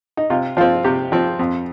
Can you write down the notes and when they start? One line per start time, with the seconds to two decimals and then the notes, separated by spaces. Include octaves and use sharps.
0.17 D#4
0.30 C3 F4
0.57 F3 C4 F4
0.84 C3 G4
1.12 F3 C4
1.39 F2